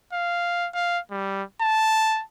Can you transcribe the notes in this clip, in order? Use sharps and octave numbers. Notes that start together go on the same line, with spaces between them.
F5
F5
G3
A5